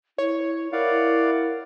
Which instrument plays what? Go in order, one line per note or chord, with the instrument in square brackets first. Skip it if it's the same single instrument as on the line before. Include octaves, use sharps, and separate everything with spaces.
[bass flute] E4 [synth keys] C#5
[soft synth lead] E4 [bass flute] A#4 [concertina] D5 F5 F#5